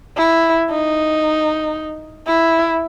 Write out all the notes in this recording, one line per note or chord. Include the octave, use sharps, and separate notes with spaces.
E4
D#4
E4